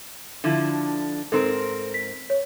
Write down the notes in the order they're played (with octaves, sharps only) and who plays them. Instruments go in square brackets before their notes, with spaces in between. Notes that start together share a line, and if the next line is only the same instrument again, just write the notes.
[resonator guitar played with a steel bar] D3 F3 E4
[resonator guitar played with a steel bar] G#2 C4 A#4 [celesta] A4
[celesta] B6
C#5